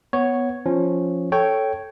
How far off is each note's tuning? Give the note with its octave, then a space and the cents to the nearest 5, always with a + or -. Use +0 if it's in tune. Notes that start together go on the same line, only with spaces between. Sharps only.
B3 +0 C#5 +0
F3 +0 C#4 -5
A4 +0 C#5 +0 G5 -10